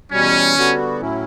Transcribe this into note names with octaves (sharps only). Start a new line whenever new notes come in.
E2 B2 G3 C#4
D3 G3 B3 F#4
A2 F#3 C#4 E4